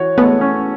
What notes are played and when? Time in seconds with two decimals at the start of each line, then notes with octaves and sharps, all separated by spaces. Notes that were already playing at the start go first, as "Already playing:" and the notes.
Already playing: E3 F#4 C#5
0.18 G#3 A3 B3
0.41 C#4